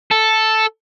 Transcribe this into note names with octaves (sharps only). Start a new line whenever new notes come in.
A4